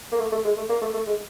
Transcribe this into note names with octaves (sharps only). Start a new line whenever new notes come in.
A#3
A3
A3
G#3
A3
A#3
A3
A3
G#3